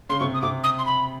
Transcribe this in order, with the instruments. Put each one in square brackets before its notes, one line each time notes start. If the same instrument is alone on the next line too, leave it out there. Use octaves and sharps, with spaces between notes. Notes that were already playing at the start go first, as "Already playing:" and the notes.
[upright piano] C#3 [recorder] C6
[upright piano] C3 [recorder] C#6
[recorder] D#6
[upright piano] C3 [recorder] D6
[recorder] D#6
C6
B5